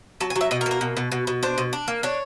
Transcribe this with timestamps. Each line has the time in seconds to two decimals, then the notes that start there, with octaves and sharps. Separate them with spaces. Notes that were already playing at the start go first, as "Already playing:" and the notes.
0.20 F#3 A5
0.30 G#5
0.36 F#3
0.41 E5
0.51 B2 D#5
0.61 A#4
0.66 A#3
0.71 A#4
0.81 B2
0.97 B2
1.12 B2
1.27 B2
1.43 D4 C5
1.58 B2
1.73 D4
1.88 A#3
2.03 D4 C#5